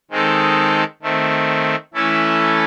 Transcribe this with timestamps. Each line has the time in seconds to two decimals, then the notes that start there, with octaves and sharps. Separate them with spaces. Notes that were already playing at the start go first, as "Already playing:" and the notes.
0.11 D#3 G#3 C4 D#4 A4
1.02 D#3 A3 C4
1.94 E3 A3 C#4 E4 A4